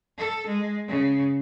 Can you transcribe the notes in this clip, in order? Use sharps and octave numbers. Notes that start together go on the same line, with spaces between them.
A4
G#3
C#3